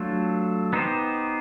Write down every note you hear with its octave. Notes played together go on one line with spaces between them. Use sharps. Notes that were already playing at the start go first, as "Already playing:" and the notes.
Already playing: F#3 A3 D4 F4 A4
B3 D#4 G4 C5